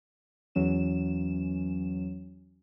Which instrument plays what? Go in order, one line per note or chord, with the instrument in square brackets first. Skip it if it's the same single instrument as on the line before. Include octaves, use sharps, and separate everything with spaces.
[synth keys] E2 E3 F#3 C#4 E7